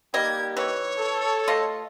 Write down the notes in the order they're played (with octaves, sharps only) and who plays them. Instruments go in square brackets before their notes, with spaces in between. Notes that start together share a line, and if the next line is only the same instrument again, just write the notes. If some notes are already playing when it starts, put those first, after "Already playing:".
[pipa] G3 D#5 [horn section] A#3 D#4 G4 [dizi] G#6
[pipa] E3 [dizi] C#5
[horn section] A4
[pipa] A3 F4 D#5